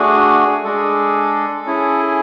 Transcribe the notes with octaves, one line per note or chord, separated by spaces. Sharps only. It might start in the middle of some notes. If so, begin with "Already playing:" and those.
Already playing: A3 D4 F#4 G#4
G#3 D4 G#4 A4
C#4 E4 G#4